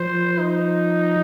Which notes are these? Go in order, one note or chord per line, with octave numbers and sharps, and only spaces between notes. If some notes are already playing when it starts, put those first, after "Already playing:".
Already playing: F3 C5
D#4